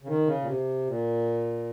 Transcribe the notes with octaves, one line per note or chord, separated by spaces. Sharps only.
C#3
D#3
C#3
A#2
C3
A#2